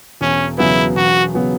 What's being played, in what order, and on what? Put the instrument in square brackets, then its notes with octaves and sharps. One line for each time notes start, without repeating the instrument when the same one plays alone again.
[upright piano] E1 [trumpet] C#4
[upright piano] E2 C#3 F#3 B3 [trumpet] E4
[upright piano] E1 [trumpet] F#4
[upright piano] C#3 F#3 B3